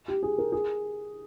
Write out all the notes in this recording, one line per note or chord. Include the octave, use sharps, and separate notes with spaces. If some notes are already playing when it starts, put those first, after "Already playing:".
G4
G#4
A#4
G#4